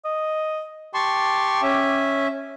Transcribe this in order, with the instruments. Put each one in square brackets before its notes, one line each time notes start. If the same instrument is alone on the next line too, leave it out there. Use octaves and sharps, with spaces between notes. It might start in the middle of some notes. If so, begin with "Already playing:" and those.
[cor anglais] D#5
[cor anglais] G4 [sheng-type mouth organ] A5 C6 C#6
[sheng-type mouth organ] C#4 E5